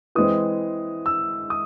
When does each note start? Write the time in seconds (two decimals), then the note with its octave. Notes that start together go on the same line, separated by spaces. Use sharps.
0.15 E3 G#3 C4 D#6
1.06 E6
1.50 D#6